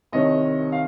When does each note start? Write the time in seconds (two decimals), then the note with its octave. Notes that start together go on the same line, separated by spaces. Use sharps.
0.12 C2 C3 D#3 C#5 D#5
0.72 F5